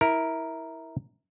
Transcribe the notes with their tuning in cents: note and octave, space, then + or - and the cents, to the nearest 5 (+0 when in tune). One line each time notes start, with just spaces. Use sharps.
E4 -20 A#4 +0